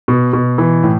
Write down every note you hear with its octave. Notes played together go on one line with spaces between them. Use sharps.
B2
B2
E3
A2